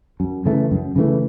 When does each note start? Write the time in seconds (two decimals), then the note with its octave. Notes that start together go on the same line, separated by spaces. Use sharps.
0.20 F#2
0.46 C#3 E3 A3
0.71 F#2
0.96 C#3 E3 A3